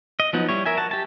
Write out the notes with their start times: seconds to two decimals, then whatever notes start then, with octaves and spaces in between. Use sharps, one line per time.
0.20 D#5
0.33 F3 F#3 B3 D#4
0.49 G3 E4 C#5
0.66 A#4 E5 G#5
0.78 F#4 A5
0.91 G4 A5